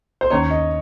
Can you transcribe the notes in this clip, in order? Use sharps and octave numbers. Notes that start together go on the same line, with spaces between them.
C5
D#2 D#3 A#3 C#4 C#5
D#5